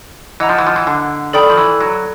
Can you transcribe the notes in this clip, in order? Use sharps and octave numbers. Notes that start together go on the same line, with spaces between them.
E3 D#5 F#5 A#5
F3
E3
F3
E3
D3
D#3 A4 D5 G5 B5
F3
E3
F#3